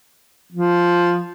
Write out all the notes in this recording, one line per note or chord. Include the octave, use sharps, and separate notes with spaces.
F3